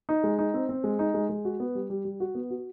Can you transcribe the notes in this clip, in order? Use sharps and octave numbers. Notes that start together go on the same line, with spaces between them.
D#4
G#3
D#4
C4
C4
G#3
D#4
G#3
G#3
F#4
B3
G3
G3
G3
F#4
B3
F#4